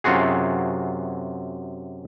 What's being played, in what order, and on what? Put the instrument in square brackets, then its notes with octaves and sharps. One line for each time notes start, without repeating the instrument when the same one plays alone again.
[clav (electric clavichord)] F#2 C3 F4 F#4 G#4